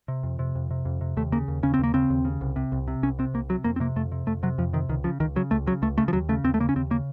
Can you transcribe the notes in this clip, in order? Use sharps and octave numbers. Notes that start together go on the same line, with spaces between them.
C3
F2
C3
F2
C3
F2
C3
D#2 A3
C#3 A#3
D#2
C#3 C#4
C4
D#2 A#3
C#3 C4
D#2
C#3
C2
C3
C2
C3
C2 C#4
C3 C4
C2 A#3
C3 F#3
F2 A#3
C4
C3 A#3
F2 A3
C3
F2 A3
C3 F#3
F2 F3
C3 D#3
C#2 D#3
C#3 F3
C#2 D#3
C#3 F#3
C#2 A3
C#3 F#3
C#2 A3
C#3 A3
F3
D#2 F#3
C#3 A3
D#2 C4
A3
C#3 A#3
C#4
D#2 C4
C#3 A#3